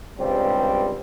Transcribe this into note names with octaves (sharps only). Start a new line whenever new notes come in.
C#2 G2 G3 C4